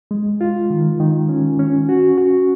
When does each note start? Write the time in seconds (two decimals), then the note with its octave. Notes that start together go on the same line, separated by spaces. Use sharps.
0.11 G#3
0.41 F4
0.70 D#3
1.00 D#3
1.29 C#4
1.59 C#4
1.89 F#4
2.17 F#4